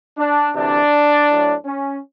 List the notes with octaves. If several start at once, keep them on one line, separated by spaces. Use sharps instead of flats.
D4
D2 C3 E3 D4
A2 F#3
C#4